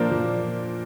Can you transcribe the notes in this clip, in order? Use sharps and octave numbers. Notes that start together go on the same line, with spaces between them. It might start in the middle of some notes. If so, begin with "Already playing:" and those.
Already playing: A#2 F3 A#3 D4 A#4 C5
A#2